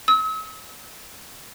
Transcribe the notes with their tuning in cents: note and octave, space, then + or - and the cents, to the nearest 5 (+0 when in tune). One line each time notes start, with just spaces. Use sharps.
E6 -45